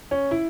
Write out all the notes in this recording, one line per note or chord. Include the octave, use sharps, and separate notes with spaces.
C#4
E4